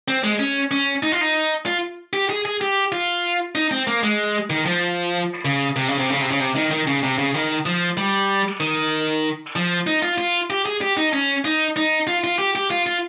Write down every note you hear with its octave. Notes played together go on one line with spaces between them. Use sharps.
C4
G#3
C#4
C#4
D#4
F4
D#4
F4
G4
G#4
G#4
G4
F4
D#4
C4
A#3
G#3
D#3
F3
C#3
C3
C#3
C3
C#3
C3
C#3
C3
D#3
D#3
C#3
C3
C#3
D#3
F3
G3
D#3
F3
D#4
F4
F4
G4
G#4
G4
D#4
C#4
D#4
D#4
F4
F4
G4
G4
F4
F4